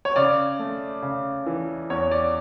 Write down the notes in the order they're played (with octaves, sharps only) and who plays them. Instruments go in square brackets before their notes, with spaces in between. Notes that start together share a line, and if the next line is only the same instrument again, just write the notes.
[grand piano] C#5
C#3 D5
A3
C#3
E3
E2 C#5
D5